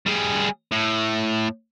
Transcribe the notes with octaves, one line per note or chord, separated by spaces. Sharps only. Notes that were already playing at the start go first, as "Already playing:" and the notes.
G3 G#4
A2